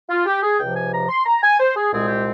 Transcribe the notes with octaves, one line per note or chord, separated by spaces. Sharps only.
F4
G4
G#4
C#2 C3 F3 G5
G#5
A#5
C6
A#5
G#5
C5
G#4
C2 A#2 G#3 C4 G#4
G4